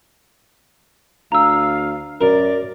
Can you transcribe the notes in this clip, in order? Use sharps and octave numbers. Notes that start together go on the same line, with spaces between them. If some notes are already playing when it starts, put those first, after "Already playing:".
D2 F5 A#5 E6
F#2 A#4 D5